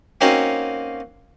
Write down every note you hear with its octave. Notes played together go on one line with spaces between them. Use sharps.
A#3 C4 C#4 D#4 F#4